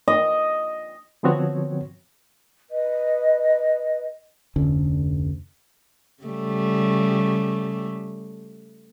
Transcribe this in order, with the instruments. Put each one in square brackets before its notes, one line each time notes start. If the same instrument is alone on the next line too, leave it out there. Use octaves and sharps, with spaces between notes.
[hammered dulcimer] D#5
[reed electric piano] D3 F3 B3 C4 F#4 C#5
[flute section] B4 D#5
[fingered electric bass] F1 D2 D3 C#4
[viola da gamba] C#3 G3 A3